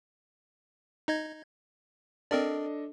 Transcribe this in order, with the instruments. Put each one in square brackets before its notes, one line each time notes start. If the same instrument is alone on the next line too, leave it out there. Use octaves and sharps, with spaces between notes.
[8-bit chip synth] D#4 D#5 G#6
[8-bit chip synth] C4 A#4 D5 [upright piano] D4 A4 D#5